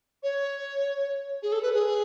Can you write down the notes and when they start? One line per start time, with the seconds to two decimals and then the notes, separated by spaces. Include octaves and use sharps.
0.23 C#5
1.43 G#4
1.52 A4
1.63 B4
1.73 G#4